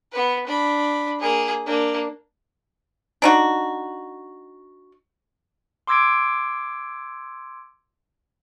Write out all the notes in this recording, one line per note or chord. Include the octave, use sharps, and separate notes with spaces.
B3 B4
D4 B5
A#3 G#4
A#3 D4
D4 D#4 F#4
C6 D6 E6 G#6 A#6 D7